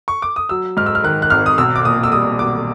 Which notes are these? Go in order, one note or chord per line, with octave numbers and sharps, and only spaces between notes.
C#6
D6
D#6
F#3 E6
G#2 F6
E6
F6
D#3 F#6
F#6
G#1 F6
D#6
B1 E6
D6
A#2 D#6
E6
G3 D#6
B1 D6